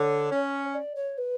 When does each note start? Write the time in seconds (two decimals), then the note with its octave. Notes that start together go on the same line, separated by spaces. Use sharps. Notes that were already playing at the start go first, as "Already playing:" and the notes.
Already playing: D3 C#5
0.31 C#4
0.74 D5
0.95 C#5
1.18 B4